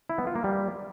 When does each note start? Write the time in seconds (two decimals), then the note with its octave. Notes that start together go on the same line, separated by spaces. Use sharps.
0.10 E4
0.18 B3
0.27 F4
0.36 A#3
0.44 G3